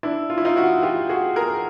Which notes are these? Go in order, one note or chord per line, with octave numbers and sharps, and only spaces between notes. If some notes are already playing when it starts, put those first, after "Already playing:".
D4 E4
F4
E4
D#4 F4
E4 F#4
F4 G4
F#4 G#4
G#4 A#4